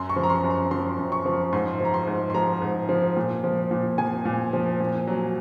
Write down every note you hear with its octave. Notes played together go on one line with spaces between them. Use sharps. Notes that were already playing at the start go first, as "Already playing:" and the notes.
Already playing: F#2 C6
C#6
F3
A#5
C6
F#2
A#5
F3 C6
F#2
C#6
F3
G#2 C6
F3 A#5
C6
G#2
C6
F3 A#5
G#2
F3
A#2
F3
A#2
F3 G#5
A#2
F3
A#2
F#3